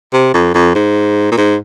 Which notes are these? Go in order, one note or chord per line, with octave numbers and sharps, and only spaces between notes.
C3
F2
F2
G#2
A#2
G#2